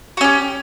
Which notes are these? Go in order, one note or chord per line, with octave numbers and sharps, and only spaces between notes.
C#4 F#4 G4